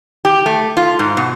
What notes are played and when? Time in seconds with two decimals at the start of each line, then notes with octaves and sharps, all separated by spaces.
0.25 G4
0.46 A3
0.77 F4
0.99 G#2
1.17 B2